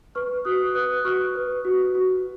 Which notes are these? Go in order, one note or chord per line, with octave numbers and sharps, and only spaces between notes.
B4 C#6 F6
F#4 D#6 F#6
B4 D#6 F#6
F#4 C#6 F6
B4
F#4
F#4